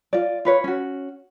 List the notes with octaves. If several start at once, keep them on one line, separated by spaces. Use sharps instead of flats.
F4 D5
F4 B4 C#5
C#4 F#4